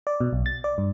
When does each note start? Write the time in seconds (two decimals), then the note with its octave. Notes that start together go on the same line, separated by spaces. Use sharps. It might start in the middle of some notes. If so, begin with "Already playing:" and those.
0.07 D5
0.21 B2
0.33 B1
0.46 A6
0.64 D5
0.78 G2